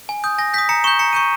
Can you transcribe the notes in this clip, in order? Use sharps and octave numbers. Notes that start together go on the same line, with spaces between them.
G#5
D#6 G6
G#5 A#6
D#6 G6 B6
A#5 C#7
C#6 G6 E7
A#5 C#7
C#6 G6 D#7